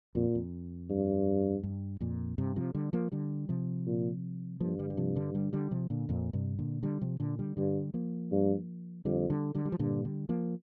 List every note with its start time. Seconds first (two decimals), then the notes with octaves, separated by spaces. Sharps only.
0.15 F2 A#2
0.35 F2
0.90 G2
1.63 G2
2.01 F2 A#2
2.38 G2 C3
2.56 C3 F3
2.75 D3 G3
2.93 F3 A#3
3.12 D3 G3
3.49 C3 F3
3.87 A#2
4.60 G2 F3 A#3
4.79 D3 G3
4.90 G3
4.97 C3 F3
5.15 D3 G3
5.34 D3 G3
5.53 D3 G3
5.71 C3 F3
5.90 A#2 D3
6.09 F2 A#2
6.33 G2 C3
6.59 A#2 D3
6.83 D3 G3
7.01 C3 F3
7.20 A#2 D3
7.39 D3 G3
7.57 G2 D3 G3
7.94 F3 A#3
8.31 G2
9.05 F2 D3 G3
9.30 D3 G3
9.54 D3 G3
9.65 G3
9.72 F3
9.79 G2 A#2 D3
10.05 D3 G3
10.29 F3 A#3